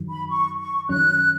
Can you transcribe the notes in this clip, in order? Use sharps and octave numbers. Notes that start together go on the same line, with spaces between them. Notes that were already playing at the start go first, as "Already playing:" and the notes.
Already playing: F#2 D#3 F#3
B5
C#6
C#6
F#2 D#3 F#3 C#4 F#6